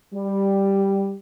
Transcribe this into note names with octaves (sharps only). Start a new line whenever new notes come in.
G3